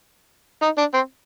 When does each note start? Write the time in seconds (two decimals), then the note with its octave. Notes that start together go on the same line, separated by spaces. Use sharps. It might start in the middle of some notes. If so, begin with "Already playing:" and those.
0.62 D#4
0.78 D4
0.94 C4